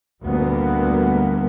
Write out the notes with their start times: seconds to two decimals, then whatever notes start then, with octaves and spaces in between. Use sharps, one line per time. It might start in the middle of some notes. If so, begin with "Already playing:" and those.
0.23 D2 A#2 G3 A#3 B3